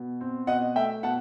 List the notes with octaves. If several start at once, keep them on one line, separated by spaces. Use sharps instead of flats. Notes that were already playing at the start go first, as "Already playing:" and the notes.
Already playing: B2
C4
B2 D#5 F#5
A3 E5 G5
B2 F#5 A5